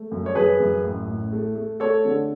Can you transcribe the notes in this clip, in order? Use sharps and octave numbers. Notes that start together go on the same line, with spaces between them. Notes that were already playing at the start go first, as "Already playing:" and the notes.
Already playing: A3
F#2
C#5
F#2 G#4 B4
F#2
A1
A2
A3
A3
A3 A4 C#5
D3